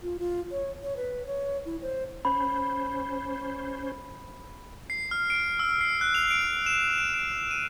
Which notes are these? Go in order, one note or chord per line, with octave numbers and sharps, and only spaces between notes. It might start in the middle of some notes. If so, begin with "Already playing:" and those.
F4
F4
C#5
C#5
B4
C#5
E4
C5
C#4 C5 B5
C7
F6
D7
E6
C7
F#6
F7
D7
E7
D7
D7
D#7